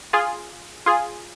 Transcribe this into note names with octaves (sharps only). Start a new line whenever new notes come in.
F4 G#4
F4 G#4